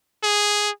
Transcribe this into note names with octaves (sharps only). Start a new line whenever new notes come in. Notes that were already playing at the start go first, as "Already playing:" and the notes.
G#4